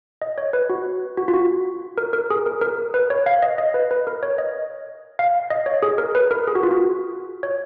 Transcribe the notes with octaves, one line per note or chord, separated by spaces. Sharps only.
D#5
C#5
B4
F#4
F#4
F4
F#4
A#4
A#4
G#4
A#4
A#4
B4
C#5
F5
D#5
D#5
B4
B4
A#4
C#5
D#5
F5
D#5
C#5
G#4
A#4
B4
A#4
G#4
F#4
F4
F#4
C#5